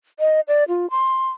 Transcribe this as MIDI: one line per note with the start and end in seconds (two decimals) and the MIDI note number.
0.20 0.40 75
0.48 0.64 74
0.68 0.89 65
0.90 1.29 84